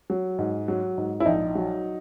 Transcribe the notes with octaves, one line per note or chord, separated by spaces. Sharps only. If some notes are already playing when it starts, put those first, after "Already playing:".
F#3
G#2
F#3
G#2
E4
A#1 D#4
F#3